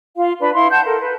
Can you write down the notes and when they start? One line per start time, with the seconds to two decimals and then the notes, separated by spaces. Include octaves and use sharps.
0.17 F4 F5
0.40 D4 B4 B5
0.55 E4 F5 C6
0.70 F#5 A5 G6
0.85 A4 A#4
1.01 B4